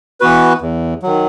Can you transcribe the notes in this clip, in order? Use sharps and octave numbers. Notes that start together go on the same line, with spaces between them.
E3 B3 F#4 B4
E2
D#3 F#3